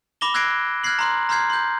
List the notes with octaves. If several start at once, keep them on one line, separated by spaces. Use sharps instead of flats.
B5 D6 A#6 E7 G7
E6 F#6 G#6 A#6 C7 D7
F6 F#6 G#6 A#6 C7 F#7
A#5 C6 F#6
A#5 C6 F6 G6 G#6 C7
C6 G6